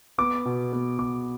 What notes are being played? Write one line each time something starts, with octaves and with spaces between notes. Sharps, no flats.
B3 D6
B2
B3
B2 D6